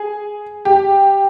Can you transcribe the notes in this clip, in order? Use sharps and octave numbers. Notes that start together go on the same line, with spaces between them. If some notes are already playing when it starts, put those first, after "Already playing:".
Already playing: G#4
G4